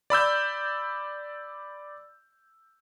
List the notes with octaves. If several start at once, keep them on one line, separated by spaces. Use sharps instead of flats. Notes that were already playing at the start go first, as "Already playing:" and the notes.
D5 B5 E6 G6